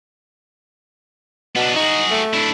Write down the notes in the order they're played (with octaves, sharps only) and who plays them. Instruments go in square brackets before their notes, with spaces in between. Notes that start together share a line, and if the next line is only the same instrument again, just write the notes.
[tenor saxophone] B2 [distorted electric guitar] B3 D4
[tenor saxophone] D#4 [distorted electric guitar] F#4 G#4
[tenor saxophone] A3
[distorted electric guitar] D4 E4